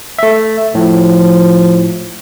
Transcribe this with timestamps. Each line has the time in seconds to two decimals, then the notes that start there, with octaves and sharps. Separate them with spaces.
0.19 A3 E5
0.75 A2 F3